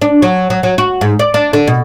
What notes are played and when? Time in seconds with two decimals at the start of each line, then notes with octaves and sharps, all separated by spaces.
0.02 D4
0.22 F#3
0.50 F#3
0.63 F#3
0.78 F#4
1.01 G#2
1.19 D5
1.34 D4
1.53 D3
1.67 B2